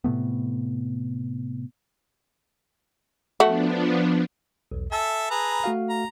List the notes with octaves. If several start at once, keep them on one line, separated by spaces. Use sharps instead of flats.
A2 C3 A3 B3
F3 A3 B3 D4 F#4
B1 E2
A4 E5 G#5 A5 E6
G#4 B4 A#5
A3 F#4 F5
A#5